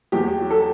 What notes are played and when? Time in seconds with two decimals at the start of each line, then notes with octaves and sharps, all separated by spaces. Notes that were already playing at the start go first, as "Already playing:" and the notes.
0.12 E2 G4
0.38 F#3
0.50 A4